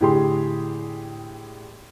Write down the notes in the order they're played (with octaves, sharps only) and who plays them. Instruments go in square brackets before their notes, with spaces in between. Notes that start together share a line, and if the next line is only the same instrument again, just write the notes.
[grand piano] A2 D3 G4 G#4 C6